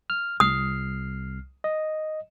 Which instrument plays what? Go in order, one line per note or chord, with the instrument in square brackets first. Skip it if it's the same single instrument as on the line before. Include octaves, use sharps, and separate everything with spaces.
[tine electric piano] F6
[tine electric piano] C2 F6 C7 [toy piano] D#6
[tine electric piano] D#5